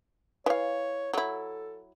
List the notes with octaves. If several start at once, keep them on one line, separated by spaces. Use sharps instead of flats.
E3 C#5 F5
F#3 E4 A4